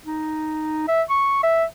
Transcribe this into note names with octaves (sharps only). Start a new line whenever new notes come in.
D#4
E5
C#6
E5